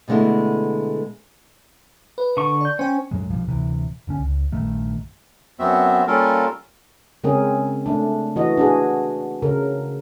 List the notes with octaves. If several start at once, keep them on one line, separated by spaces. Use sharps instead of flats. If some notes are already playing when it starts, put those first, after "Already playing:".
B2 D3 G#3 A3 E4
B4
D3 C#6
D5 G6
C#4 C5 G5
F#2 A2 F#3 G#3
B1 G2 F3
D1 C3 E3
F#1 D3 C#4
C#2
A#1 G2 D#3 A3
F#2 B3 C4 F#4 E5
G3 A#3 C#4 F4 A4 A#4
C#3 G#3 C4 C#4 G#4 A#4
A3 D4
E3 F#4 D#5
D4 F#4 G#4
C#3 A#4